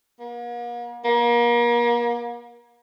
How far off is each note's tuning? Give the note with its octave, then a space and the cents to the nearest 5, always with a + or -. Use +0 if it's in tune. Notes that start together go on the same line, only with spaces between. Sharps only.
A#3 +45
A#3 +35